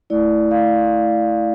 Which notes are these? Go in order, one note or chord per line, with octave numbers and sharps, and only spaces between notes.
A3 E4 D5
F5